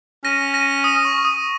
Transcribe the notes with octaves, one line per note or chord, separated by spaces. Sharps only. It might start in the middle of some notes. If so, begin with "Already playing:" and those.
C#4 A#6 D#7
A#6 D#7
D#6
C#6
C#6
D#6